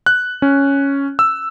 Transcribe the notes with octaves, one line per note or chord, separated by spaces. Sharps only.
F#6
C#4
E6